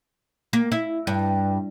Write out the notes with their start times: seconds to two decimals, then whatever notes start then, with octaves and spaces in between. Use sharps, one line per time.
0.53 A#3
0.72 E4
1.07 G2